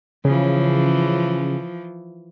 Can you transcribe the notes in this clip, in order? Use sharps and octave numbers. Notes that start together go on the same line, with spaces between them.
C#3 E3 F3